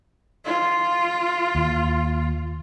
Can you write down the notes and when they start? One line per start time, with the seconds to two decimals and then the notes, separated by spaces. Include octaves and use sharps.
0.45 F4
1.55 D#2